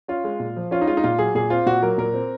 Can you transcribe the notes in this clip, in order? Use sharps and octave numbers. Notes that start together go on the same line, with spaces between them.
C#4 F4
G#3
A#2
F3
C#4 F4
D#4
G#3 F4
D#4
A#2 F4
F#3 G#4
A#2 G#4
C4 F4
A#2 F#4
F#3 A#4
A#2 A#4
C4